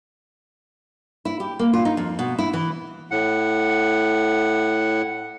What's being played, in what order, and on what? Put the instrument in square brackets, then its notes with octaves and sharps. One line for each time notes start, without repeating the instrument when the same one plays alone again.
[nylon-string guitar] E4
G4
A#3
F4
D#4
F2
B2
E4
E3
[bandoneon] A2 F#5